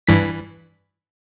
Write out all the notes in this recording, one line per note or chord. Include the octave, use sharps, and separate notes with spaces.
G2 E3 B6